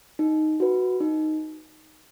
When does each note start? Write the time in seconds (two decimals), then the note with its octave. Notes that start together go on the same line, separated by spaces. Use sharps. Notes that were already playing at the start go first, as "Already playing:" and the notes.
0.19 D#4
0.60 F#4 B4
1.00 D#4